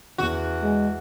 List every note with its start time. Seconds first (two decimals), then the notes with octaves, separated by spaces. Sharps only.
0.18 E2 F#4
0.62 G#3